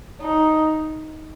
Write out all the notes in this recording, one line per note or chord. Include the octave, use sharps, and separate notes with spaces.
D#4